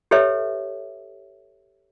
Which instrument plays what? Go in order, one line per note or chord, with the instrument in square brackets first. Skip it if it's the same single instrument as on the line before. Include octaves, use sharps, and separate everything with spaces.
[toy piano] G4 A4 B4 C#5 E5